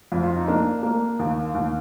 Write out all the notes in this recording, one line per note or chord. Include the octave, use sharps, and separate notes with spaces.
F2
F4
D#4
A#3 D4
A#3
D#2
D#2